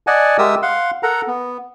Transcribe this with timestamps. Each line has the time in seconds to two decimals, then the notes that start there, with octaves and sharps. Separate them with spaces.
0.07 D5 D#5 F#5 G#5 A5
0.38 G#3 G4 A#4 E5 D#6 E6
0.62 F5 F#5 C6
1.03 A4 A#4 F#5 A#5
1.27 B3